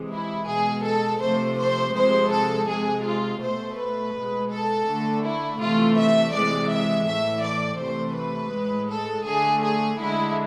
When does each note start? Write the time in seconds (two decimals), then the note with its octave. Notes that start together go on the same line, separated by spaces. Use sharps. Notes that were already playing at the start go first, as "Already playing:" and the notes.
Already playing: C3 E3 G#3
0.11 E4
0.47 B2 G#3 G#4
0.84 A4
1.20 C3 F3 A3 C5
1.58 C5
1.93 C3 F3 G#3 C5
2.30 A4
2.67 C3 G#3 G#4
3.04 F4
3.40 B2 A3 C5
3.76 B4
4.13 B2 G#3
4.50 A4
4.86 D3 A3
5.23 E4
5.59 C3 E3 A3 F4
5.96 E5
6.32 C3 E3 G#3 D5
6.70 E5
7.05 A2 E3 A3 E5
7.42 D5
7.78 C3 E3 A3 C5
8.15 B4
8.52 A2 G#3
8.89 A4
9.25 D3 A3 G#4
9.61 G#4
9.98 D3 G#3 E4